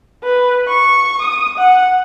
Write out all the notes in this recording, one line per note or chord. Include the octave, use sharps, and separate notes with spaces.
B4
C#6
D#6
F#5